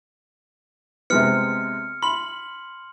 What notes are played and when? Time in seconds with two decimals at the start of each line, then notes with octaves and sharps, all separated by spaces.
1.10 C3 G#3 B3 F6 C#7
2.02 B5 C6 F#7